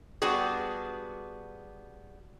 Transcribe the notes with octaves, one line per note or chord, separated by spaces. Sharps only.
G3 B3 D4 F#4 G#4